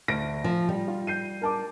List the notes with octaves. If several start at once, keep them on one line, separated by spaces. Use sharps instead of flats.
D2 A#6 D7
F3
G3
F4
G6 C7 D#7
A#4 A5 D6